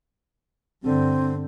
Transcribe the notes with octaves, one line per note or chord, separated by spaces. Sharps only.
G2 D3 C4